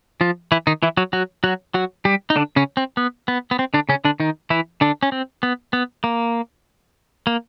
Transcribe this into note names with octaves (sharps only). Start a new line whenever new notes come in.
F3 F4
E3 E4
D#3 D#4
E3 E4
F#3 F#4
F#3 F#4
F#3 F#4
F#3 F#4
G3 G4
D#4
D3 D4
C#3 C#4
C4
B3
B3
B3
C4
D3 D4
C#3 C#4
D3 D4
D#3 D#4
E3 E4
D3 D4
C#4
C4
B3
B3
A#3
A#3